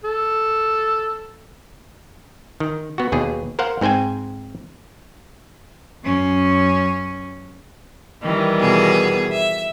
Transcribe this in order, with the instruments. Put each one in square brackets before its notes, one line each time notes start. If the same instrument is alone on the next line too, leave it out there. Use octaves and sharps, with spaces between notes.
[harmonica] A4
[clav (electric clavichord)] D#3
B3 F#4
D#2 B2 G#4
A#4 C5 F5 F#5
G#2 C4 C5 G5 G#5
[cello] F#2 C#4
[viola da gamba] D#3 E3 G3
[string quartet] B2 B3 G#4
E5